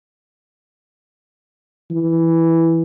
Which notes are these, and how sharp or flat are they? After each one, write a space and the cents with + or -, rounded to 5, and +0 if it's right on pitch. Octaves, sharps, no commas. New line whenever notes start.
E3 +0